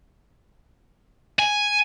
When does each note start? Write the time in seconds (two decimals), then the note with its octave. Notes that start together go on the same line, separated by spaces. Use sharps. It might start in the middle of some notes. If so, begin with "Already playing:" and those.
1.39 G#5